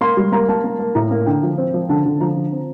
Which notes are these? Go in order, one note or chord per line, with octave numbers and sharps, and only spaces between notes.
A#3 C6
G3
A#3 A#5
A#3 A5
A#3
A#3
A2 A#5
A#3
D3 G5
F3
C4
F3
D3 A5
D3
F3 A#5
D3
C4